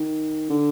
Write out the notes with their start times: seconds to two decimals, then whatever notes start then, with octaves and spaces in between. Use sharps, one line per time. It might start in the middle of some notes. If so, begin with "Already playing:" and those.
Already playing: D#3
0.50 D3